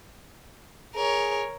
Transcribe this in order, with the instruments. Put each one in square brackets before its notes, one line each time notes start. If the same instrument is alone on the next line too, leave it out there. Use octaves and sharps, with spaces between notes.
[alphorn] G#4 [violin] A#4 C#5